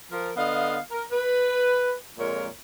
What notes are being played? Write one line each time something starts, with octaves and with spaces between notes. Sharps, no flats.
F3 A#4
D3 B3 D#5 F5
A#4
B4
F2 A#2 G#3 A#4 C#5